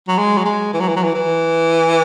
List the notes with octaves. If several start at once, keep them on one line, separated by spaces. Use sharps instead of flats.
F#3
G#3
F#3
G#3
E3
F#3
E3
F#3
E3
E3